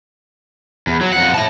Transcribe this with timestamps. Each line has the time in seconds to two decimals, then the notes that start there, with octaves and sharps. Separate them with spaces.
0.87 E2
1.01 F#3
1.13 F2 F#5
1.34 E4 A5